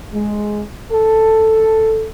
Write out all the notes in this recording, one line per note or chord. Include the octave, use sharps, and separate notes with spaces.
G#3
A4